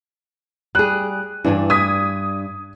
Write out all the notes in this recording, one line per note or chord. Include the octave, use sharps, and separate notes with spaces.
G3 G#4 F#6
G2 E3 D4 G#5
D#6 G#6 B6